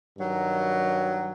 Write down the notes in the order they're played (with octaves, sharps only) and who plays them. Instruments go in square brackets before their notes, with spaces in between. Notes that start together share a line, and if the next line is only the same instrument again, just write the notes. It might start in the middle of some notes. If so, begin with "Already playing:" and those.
[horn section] G2 D#3 F#3